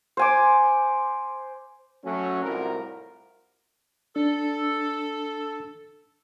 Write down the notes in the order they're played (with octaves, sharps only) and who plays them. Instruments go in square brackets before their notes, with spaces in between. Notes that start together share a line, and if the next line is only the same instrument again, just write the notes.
[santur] C5 G#5 D6
[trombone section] F#3 A3 C#4
C2 A2 C4 F4 F#4 A#4
[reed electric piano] D4 [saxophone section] A4